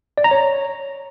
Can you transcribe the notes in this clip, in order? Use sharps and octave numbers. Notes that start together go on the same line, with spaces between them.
D5
A#5
C#5